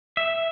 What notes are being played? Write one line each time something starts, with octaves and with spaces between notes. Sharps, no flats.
E5